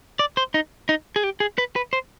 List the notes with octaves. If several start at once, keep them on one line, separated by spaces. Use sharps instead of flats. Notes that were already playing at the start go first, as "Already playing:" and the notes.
D5
C5
D#4
D#4
G#4
G4
G#4
B4
B4
C5